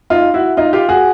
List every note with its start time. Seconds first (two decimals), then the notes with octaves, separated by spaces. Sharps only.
0.10 D#4 F4
0.34 E4 F#4
0.57 D#4 F4
0.73 F4 G4
0.89 F#4 G#4